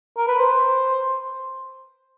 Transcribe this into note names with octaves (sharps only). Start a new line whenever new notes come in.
A#4
B4
C5